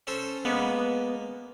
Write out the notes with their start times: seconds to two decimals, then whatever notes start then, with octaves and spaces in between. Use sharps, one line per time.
0.07 C#4 A4 C5
0.45 G#3 A#3 B3